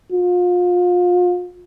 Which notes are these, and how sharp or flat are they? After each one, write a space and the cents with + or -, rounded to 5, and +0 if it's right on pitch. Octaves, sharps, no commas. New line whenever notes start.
F4 +35